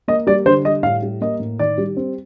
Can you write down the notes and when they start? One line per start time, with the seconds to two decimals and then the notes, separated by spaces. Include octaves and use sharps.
0.08 A#3 D#5
0.27 G3 D5
0.46 D3 C5
0.64 G3 D#5
0.83 A2 F5
1.02 G3
1.21 A#3 D#5
1.40 A2
1.59 D#3 D5
1.78 G3
1.97 C4